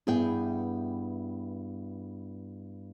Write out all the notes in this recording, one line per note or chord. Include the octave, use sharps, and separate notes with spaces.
G2 B3 E4 G#4 G5